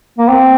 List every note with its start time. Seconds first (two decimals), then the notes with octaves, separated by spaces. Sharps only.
0.19 A#3
0.29 C4